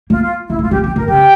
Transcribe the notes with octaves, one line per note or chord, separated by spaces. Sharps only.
A#3 F4
F4
A#3 E4
G#3
F4
G3 G4
F3 G4
E3 A#4
C#3 G4 G5